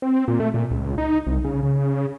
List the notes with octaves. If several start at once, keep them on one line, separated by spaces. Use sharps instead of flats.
C4
A#2
A3
A#2
C#2
D#4
C2
C#3
C#3